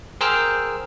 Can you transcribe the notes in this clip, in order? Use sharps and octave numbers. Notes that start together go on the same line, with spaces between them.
G#4 A#4 C5 G5 E6 F6